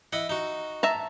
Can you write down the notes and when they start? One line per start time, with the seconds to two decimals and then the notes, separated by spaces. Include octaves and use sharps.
0.13 E4 D#5 F#5
0.29 D#4 F#4
0.83 E5 A5 A#5